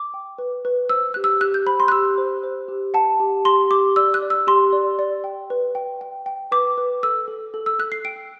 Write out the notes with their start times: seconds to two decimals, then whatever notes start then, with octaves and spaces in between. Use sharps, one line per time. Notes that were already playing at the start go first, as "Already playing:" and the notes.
Already playing: D6
0.14 G5
0.38 B4
0.65 B4
0.90 C5 E6
1.14 G4 F#6
1.24 E6
1.41 G4 F#6
1.54 G6
1.66 C5 B5
1.80 C6
1.88 F#6
1.92 G4 E6
2.18 C5
2.43 C5
2.68 G4
2.94 F#5 A5
3.20 G4
3.45 G4 C6
3.71 G4 D6
3.96 D5 E6
4.14 F#6
4.22 D5
4.30 E6
4.47 G4 C6
4.72 D5
4.99 D5
5.24 G5
5.50 B4
5.75 G5
6.01 G5
6.26 G5
6.51 B4 D6
6.78 B4
7.03 A4 E6
7.28 A4
7.54 A4
7.66 E6
7.79 A4 F#6
7.92 C7
8.05 G5 D7